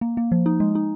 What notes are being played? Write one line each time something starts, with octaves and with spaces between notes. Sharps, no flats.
A#3
A#3
F3
D#4
G#3
D#4